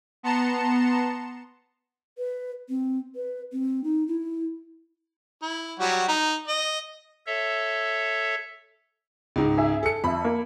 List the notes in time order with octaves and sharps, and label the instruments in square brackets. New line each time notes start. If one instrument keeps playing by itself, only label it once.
[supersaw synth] B3 A5 A#5 C6 C#7 E7
[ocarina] B4
C4
B4
C4
D#4
E4
[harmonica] E4
F#3 G3 F#4
D#4
D#5
[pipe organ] A4 C#5 E5
[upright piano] C#2 G#2
[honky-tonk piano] G#4 E5
[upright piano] A4 C#7
[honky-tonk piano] F2 E5 [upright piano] B5
[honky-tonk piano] A#3